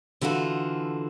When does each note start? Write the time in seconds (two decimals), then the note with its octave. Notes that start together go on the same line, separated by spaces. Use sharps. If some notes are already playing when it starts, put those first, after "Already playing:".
0.21 D3 E3 F4 F#4 A4